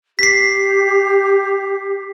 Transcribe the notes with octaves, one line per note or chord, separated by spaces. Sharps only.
G4 B6 C7